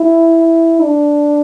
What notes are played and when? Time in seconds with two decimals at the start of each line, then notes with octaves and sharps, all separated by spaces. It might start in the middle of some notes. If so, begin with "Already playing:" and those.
Already playing: E4
0.82 D4